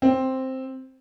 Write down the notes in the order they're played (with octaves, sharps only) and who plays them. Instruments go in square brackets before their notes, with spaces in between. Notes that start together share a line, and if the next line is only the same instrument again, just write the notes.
[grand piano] C4